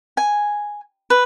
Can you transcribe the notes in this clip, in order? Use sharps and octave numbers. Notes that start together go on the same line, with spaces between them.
G#5
B4